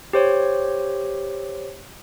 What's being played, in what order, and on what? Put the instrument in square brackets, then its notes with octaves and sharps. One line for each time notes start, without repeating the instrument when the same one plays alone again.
[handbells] G4 C5 C#5